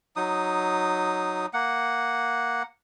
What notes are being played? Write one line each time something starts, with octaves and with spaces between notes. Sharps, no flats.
F#3 D#4 D#6
A#3 F#5